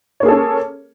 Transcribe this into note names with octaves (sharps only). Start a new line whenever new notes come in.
A#3 C#4 G#4 A4 C#5